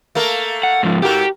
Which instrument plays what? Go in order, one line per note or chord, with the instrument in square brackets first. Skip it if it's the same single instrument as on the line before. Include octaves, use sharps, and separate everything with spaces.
[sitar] A3 A#3 A#4
[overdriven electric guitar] F#5
G#2 F3
[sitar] G#2 F#4 A#4 [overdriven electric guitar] G4